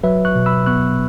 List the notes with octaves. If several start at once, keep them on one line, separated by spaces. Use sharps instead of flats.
F#3 B4 E5
C#6 F#6
B2
B5 E6
B3 C#6 F#6